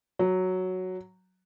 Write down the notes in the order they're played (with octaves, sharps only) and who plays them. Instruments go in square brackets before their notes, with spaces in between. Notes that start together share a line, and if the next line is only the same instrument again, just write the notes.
[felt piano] F#3